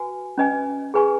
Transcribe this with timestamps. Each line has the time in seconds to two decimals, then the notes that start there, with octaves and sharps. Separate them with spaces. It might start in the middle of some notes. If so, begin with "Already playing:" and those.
Already playing: F#4 B4 G#5
0.38 C#4 B4 D#5 G#5
0.94 G#4 B4 G#5 C#6